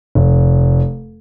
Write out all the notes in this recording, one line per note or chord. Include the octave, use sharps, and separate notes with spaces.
F1